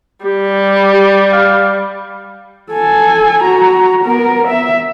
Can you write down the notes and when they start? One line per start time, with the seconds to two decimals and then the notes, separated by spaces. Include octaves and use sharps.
0.25 G3 G4
0.93 G4
1.32 F5
2.72 A4 G#5
3.43 F#4 A#5
4.04 B3 A#4
4.48 E5